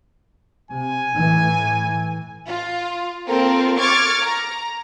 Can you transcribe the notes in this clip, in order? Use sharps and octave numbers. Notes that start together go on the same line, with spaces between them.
C3 G#5
A2 E3
F4
A#3 C4 F4 A4 A#4
C#6 D6 F6 G#6 A6
A#5